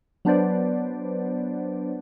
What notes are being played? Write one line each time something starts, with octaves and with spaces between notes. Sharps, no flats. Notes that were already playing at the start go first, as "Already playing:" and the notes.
F#3 B3 D4 B4 C5 D5